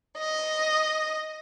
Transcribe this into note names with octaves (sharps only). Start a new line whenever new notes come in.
D#5